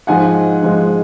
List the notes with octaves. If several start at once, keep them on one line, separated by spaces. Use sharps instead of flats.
G#2 F3 G#3 F#5 G#5
G#2 F3 G#3